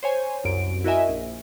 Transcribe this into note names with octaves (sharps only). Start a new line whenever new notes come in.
C5 C#5 G#5
C2 F#2 D7
E4 F#4 A#4 D#5 E5 G#5
A#1